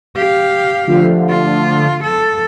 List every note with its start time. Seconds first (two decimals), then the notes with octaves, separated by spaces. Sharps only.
0.16 G4 F5
0.87 D3 F3 A3
1.29 F4
2.04 A4